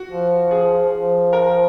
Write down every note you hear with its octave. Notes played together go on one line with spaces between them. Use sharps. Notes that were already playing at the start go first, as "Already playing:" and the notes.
Already playing: F#4
F3
G#4
F3
A#4